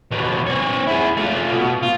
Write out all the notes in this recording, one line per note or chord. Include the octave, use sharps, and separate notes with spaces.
D#2 B2
C4 C#5
E4 G#4
A3 F4
B2
F4